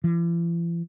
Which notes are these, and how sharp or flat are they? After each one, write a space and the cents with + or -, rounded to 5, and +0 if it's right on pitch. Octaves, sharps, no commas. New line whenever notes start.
E3 +45